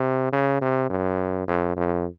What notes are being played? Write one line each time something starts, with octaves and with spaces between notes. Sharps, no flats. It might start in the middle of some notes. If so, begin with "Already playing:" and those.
Already playing: C3
C#3
C3
F#2
F2
F2